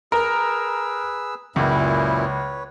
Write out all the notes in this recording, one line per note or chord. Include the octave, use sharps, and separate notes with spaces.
G#4 A#4 B4 E6
C#2 F#2 A#2 E4 B4 C#5